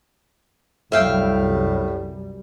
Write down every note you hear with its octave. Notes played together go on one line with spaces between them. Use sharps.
C2 F#2 A2 G3 E5 F5 G5